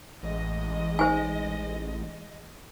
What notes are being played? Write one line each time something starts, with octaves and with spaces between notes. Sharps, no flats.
A1 E3 G#3 D#5
D#4 C5 G#5